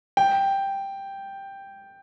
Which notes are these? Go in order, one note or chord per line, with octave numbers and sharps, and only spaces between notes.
G5